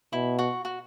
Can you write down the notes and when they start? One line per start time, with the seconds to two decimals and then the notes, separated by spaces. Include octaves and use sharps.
0.13 B2 E4
0.39 F#4
0.65 F#4